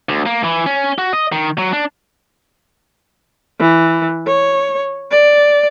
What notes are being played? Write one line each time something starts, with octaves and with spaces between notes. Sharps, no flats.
D2
A#3
E3
C#4
F#4
D#5
D#3
F#3
D4
E3
C#5
D5